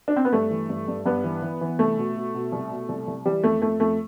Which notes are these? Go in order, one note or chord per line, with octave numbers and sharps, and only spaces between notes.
D4
C4
B3
G2 A3
E3
G2
G2
G2 B3
E3
E3
E3
C2 A3
B2
B2
B2
C2
B2
C2
C2
E3 G3
F2 A3
F2 A3
F2 A3